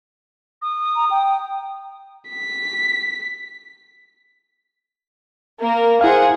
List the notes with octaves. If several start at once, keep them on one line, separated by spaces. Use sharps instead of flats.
D#6
A#5
G5
B6
A#3 A#4
E4 G#4 C5 F5 F#5